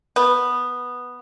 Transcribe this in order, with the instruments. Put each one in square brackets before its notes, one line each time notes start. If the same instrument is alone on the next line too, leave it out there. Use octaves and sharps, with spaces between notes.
[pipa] B3